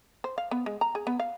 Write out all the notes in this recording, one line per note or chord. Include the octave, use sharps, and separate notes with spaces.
C5
F5
B3
G#3
A#5
G#4
B3
F5